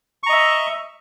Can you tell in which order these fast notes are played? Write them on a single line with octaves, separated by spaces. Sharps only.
C#6 A#5 D#5 E5